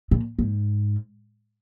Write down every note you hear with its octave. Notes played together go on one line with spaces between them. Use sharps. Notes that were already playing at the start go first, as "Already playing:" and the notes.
A#2
G#2